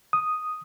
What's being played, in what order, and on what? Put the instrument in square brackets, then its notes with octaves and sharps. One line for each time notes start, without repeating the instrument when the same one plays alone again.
[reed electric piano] D#6